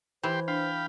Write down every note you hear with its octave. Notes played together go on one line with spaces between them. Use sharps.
E3 G4 C5 G5 C6
D4 F5 G5 B5